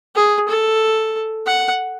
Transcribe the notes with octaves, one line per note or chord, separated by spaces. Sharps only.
G#4
A4
F#5